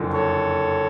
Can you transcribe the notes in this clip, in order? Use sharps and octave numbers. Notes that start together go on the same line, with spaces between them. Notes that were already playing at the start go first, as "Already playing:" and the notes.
Already playing: F#1 F2 D3 F3
A4 C#5